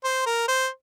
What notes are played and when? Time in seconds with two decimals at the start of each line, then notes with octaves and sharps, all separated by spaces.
0.04 C5
0.26 A#4
0.48 C5